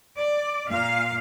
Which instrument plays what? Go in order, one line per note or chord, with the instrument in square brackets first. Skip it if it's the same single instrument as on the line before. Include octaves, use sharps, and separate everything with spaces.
[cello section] D5
A#2 F5